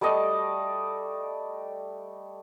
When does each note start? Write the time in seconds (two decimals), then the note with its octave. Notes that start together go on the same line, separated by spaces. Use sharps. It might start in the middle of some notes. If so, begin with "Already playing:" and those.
0.01 G3 A3 D5 D#5